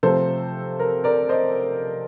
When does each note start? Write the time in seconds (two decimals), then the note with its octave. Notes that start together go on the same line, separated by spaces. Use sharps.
0.03 C3 F3 A3 A4 C5
0.79 A#4
1.04 A#4 D5
1.29 C5 D#5